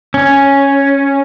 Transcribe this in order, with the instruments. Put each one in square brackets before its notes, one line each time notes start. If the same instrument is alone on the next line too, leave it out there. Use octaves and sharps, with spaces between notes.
[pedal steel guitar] C#4